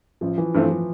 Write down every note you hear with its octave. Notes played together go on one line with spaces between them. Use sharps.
A1 F3
E3
G2 E3 F3 A3 C4
F3